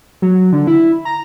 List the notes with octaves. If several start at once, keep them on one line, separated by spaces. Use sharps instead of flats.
F#3
D3
E4
A#5